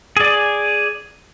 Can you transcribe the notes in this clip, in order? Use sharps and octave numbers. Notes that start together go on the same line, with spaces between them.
G#4 D5